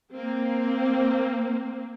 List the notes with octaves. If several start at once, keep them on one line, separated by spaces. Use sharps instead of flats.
A#3 C4